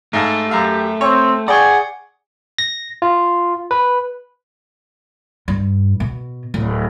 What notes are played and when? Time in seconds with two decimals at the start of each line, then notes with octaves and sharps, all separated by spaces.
0.13 G#2 A3 F5 A5
0.49 F#2 G4 F5 E6
1.01 C4 C#5
1.48 G#4 D5 F#5 G5 C#6
2.58 A#6
3.02 F4
3.71 B4
5.48 G2
6.00 B2
6.54 D1